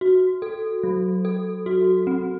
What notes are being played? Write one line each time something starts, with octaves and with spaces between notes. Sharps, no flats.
F#4
A4
F#3
A4
F#4
C4